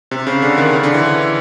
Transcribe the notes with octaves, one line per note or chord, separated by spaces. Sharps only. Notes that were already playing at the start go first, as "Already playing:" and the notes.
C3
C#3
D3
D#3
C#3
D3
E3